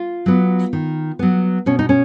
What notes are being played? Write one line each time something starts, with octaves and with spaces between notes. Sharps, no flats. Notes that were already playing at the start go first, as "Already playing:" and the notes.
Already playing: F4
F#3 B3
D#3
F#3 B3
B2 C#4
D#4
C#4